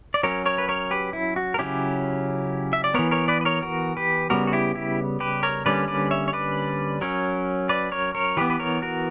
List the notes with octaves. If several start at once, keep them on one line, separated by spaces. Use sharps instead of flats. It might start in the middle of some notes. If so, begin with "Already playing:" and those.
D5
F#3 C#4 A#4 C#5
A#4 C#5
B4
A#4 C#5
G4 B4
E4
F#4
A#4
C#3 F#3 C#4 E4 G4
E5
D5
E3 B3 A#4 C#5
A#4 C#5
B4 D5
B4
A#4 C#5
F#4 A#4
G4 B4
C#3 G3 B3 F#4 A#4
F#4
E4 G4
E4 G4
G4 B4
A#4 C#5
D3 G3 A#3 C#4 B4 D5
B4 D5
C#5 E5
C#5
B4 D5
F#3 C#4 A#4 C#5
B4 D5
A#4 C#5
A#4 C#5
E3 B3 G4 B4
B4
A#4 C#5
F#4 A#4